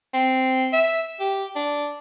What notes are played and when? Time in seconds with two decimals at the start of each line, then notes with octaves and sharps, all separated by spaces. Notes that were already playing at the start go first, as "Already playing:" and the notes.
0.14 C4
0.73 E5
1.20 G4
1.56 D4